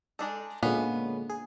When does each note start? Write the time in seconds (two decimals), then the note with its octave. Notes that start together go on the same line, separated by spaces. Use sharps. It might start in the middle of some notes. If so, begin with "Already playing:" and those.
0.19 G#3 D4 D#4 A4
0.63 A#2 D3 G#3 B3 C#4 F5
1.30 G#4